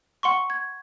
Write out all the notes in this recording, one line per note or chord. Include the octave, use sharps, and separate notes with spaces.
F#5 C6 C#6
G#6